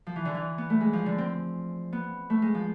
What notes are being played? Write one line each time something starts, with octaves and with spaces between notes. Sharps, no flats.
F3
E3
D3
E3
B3
A3
G#3
F3
D3
C4
B3
A3
G#3
F3